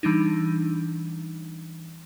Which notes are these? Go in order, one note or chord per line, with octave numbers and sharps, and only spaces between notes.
E3 G3 D4 D#4